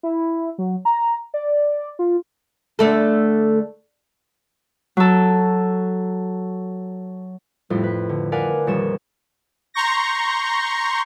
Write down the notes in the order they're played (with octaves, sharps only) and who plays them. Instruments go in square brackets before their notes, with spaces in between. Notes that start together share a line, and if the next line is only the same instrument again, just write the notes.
[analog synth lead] E4
F#3
A#5
D5
F4
[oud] D3 A3 A4
[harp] F#3 A4
F2 A2 G3 E4 F4
B4
D3
A#4 B4 D5 F5 F#5 G#5
D#1 F2 G3 C#5 E7
[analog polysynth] A#5 C6 C#6 G6 A#6